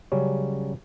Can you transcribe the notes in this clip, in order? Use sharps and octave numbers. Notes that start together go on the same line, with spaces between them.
C#3 F#3 G3 C#4